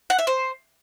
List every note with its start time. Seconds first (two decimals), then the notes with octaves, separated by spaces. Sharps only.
0.10 F#5
0.19 E5
0.27 C5